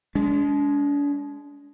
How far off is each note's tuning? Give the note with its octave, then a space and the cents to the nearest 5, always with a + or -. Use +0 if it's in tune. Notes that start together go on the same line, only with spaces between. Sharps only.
G#3 +0 D4 -40